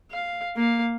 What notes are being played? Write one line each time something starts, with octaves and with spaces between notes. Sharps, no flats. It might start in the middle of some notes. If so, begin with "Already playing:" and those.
F5
A#3 F5